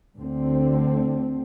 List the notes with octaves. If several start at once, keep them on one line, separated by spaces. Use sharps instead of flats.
D2 D3 C4